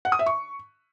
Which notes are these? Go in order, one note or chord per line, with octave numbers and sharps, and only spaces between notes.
F#5
D#6
E5
C#6